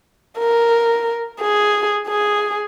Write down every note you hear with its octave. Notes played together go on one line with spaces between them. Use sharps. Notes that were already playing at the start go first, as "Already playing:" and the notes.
A#4
G#4
G#4